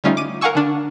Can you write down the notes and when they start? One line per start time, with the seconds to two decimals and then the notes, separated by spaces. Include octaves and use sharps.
0.04 D3 G3 A3 C#4 D#4 F4
0.17 D6 D#7
0.41 A#4 F5 F#5 G#5 C#6 E6
0.55 D3 D4